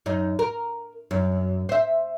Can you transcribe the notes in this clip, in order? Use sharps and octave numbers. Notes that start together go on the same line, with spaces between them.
F#2 D#4
A#4
F#2
C5 E5